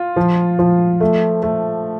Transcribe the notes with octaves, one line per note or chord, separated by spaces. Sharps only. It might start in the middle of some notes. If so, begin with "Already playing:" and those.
Already playing: F4
F3
F3
A3
A3